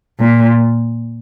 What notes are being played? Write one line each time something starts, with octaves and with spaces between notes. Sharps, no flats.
A#2